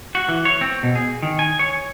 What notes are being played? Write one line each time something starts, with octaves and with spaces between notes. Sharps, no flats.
F#4
E3
C#5
C4
B2
G#4
D#3
G#5
C#5